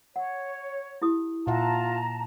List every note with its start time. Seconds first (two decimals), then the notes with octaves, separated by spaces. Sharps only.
0.16 C#5 F#5
1.02 E4 G4 D#6
1.47 A#2 F4 E5 F#5 A5 A#5